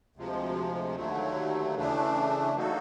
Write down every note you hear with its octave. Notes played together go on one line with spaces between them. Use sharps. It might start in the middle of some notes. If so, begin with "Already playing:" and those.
D2 C3 F3 G#3
D#2 D3 F#3 A3
C#3 E3 A3 D4
F#3 A#3 D#4 F#4 A4